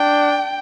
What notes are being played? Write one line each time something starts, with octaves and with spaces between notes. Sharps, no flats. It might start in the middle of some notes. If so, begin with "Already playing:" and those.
Already playing: D4 G5